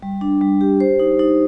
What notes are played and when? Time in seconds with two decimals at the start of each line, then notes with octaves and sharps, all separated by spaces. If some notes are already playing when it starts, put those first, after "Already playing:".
0.02 G3
0.21 D4
0.41 G3
0.61 G4
0.80 C5
0.99 D#4
1.19 D#4